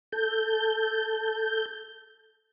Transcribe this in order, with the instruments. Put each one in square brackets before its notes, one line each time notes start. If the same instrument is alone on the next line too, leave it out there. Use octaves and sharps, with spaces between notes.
[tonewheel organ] A4 G6